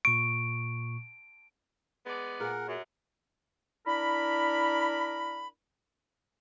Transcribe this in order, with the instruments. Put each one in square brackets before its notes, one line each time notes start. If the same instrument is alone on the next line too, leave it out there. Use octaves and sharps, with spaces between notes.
[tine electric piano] A#2 C#6 [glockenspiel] D7
[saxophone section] G#3 B3 D5
[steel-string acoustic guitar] A#2 G#4 [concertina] A#4 F#5
[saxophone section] F#2
[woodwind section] D4 E4 A#4 B5